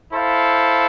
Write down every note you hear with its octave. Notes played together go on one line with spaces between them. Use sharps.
E4 A4 C5 F5